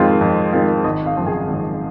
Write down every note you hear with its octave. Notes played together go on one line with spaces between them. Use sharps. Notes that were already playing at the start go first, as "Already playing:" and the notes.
Already playing: F2 D#3 G#3 C4 F4
F2
D#3 G#3 C4 F4
G#1 D#5
F5
F#2 C#3 F3 C4
G#4 G#5
G#1